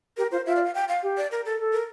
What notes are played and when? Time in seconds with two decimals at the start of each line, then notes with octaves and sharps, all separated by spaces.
0.17 G4 A#4
0.32 F4 C5
0.46 F4 E5
0.56 D5
0.64 F5
0.75 G5
0.88 F5
1.03 G4
1.17 D5
1.31 A#4
1.45 A4
1.59 A4
1.73 A#4